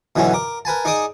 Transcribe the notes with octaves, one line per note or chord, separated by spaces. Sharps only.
B2 D3 E3 F#3 C#4 F#4
A#4 D6
A#4 B4 G#5 A5
D#4 G#4 D5 D#5 D6 D#6